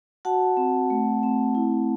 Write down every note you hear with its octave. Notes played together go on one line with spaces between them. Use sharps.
F#4 F#5 A5
C4
A3
C4
E4